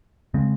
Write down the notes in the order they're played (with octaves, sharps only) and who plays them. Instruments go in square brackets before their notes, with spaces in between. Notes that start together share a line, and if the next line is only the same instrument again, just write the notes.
[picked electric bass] C#3 G#3 C4